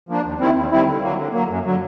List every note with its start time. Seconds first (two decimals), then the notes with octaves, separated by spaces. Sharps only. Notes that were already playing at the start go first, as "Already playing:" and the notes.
0.09 F3 A#3 D4
0.25 D#2
0.40 D#3 G3 C4 E4
0.56 D#2
0.71 D#3 G3 C4 E4
0.87 D3
1.02 F#3 A#3
1.18 D3
1.33 F#3 A#3
1.49 F#2
1.66 D3 F#3